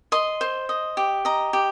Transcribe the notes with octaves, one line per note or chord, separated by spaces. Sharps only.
D#5 C6
C5
D#5
G4
D#5 A#5
G4